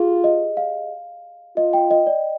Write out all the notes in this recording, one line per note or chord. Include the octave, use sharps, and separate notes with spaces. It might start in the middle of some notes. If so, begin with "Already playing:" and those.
Already playing: F4 G4 G#4
D#5
F5
F4 D#5
G5
D#5
D5